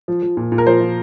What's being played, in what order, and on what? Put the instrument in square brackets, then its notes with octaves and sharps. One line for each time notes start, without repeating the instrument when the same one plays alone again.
[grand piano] F3
F3
A#2
A#2
A#4
F3 C5
F3